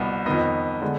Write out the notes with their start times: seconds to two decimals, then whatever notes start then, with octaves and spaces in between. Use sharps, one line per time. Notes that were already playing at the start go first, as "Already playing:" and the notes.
Already playing: C2 B2 B3
0.26 F2 D#3 B3 D#5
0.82 D3 G#3 B3